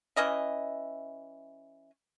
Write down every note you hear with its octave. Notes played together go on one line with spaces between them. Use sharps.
E3 C#4 D#5 E5